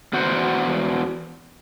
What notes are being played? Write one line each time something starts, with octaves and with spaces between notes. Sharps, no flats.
E2 F#4 C5 F#5